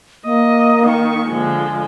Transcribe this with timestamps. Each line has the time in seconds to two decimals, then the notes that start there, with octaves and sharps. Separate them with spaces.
0.25 A#3 D#5
0.82 D#3 C#6
1.27 D3 F3 G#3